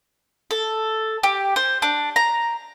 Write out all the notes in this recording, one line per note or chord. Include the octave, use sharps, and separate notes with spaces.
A4
G4
C5
D4
A#5